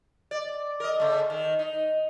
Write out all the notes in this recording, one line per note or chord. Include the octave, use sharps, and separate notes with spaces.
D5
A#4 D#5
C#3 A3
D#3
D#4